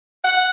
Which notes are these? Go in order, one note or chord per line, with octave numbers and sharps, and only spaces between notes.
F#5